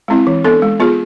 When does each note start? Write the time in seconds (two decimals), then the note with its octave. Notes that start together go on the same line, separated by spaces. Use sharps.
0.08 G#3 C4 E4
0.27 E3
0.44 B3 D4 A4
0.62 G#3
0.80 B3 F4 G#4